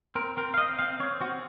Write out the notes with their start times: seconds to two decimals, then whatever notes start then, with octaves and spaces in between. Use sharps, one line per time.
0.15 C4 A#4
0.37 C4 A#4
0.54 F5
0.58 C4 D#5
0.79 C4 F5
1.00 C4 C#5
1.21 C4 F#4